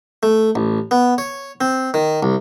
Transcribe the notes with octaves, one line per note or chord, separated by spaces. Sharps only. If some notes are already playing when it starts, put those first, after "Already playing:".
A3
A1
B3
C#5
C4
D#3
C2